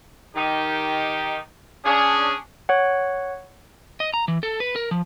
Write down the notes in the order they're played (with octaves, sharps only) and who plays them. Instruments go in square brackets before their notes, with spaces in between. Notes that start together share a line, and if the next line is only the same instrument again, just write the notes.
[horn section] D#3 D#4 G4
C#4 D4 G#4
[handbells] C#5 F#5
[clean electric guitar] D#5
A#5
E3
A4
B4
A#4
F3